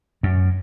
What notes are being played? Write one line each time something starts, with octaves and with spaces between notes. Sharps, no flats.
F#2